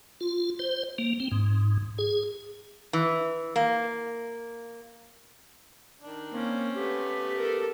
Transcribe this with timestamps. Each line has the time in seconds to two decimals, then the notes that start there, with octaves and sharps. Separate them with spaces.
0.21 F4
0.59 C5
0.98 A#3
1.20 C4
1.31 G#2
1.98 G#4
2.93 E3
3.56 A#3
6.01 D#3 D4
6.31 A#3 C4 C#4
6.75 A3 B3 G4
7.37 A4 A#4